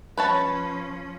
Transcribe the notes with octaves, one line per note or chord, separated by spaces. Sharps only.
F3 C#4 B4 C#5 A5